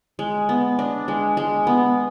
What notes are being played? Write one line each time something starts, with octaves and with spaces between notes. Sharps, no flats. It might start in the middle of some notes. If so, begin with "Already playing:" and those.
G#3
B3
D4
G#3
G#3
B3